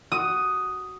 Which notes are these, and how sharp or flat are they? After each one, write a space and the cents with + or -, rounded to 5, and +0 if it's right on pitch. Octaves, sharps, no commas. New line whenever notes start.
F#4 +10 D#6 +5